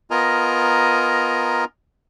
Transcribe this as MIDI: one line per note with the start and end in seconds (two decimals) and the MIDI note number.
0.11 1.65 59
0.11 1.65 65
0.11 1.65 70
0.11 1.65 75
0.11 1.65 80
0.11 1.65 82